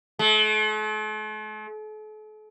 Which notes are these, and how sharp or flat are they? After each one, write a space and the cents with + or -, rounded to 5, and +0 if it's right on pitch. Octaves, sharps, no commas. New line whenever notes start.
A3 -45